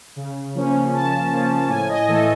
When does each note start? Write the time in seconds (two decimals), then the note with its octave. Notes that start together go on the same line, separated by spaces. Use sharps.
0.16 C#3
0.55 F3 A#3 C#4
0.93 C#3 A5
1.31 F3 A#3 C#4
1.69 A2 G#5
1.89 D#5
2.08 E3 A3 A4